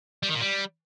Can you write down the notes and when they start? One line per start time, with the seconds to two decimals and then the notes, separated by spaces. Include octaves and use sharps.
0.23 G3
0.29 D#3
0.35 A#2
0.41 G3